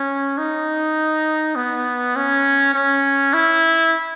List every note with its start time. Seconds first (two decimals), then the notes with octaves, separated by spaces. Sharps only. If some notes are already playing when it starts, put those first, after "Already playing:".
Already playing: C#4
0.38 D#4
1.56 B3
2.16 C#4
2.74 C#4
3.33 E4